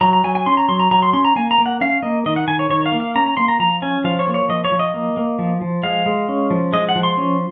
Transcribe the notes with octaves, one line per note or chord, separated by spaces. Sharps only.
F#3 A#5
A#5
F#3 G#5
G#5
C#4 C6
A#5
F#3 C6
A#5
F#3 A#5
C6
C#4 C6
A#5
A#3 G#5
A#5
A#3
F#5
C#4 F5
A#3 D#5
D#3 D#5
F#5
D#3 G#5
C#5
D#3 C#5
F5
A#3
F5
C#4 A#5
A#5
A#3 C6
A#5
F3 A#5
C#4 G#5
F3 F5
C#5
A#3
C#5
F3 D#5
C#5
F3
D#5
A#3
A#3
F3
F3
G#3 F5
G#3
C#4
F3
G#3 D#5
F#5
F3
C6
C#4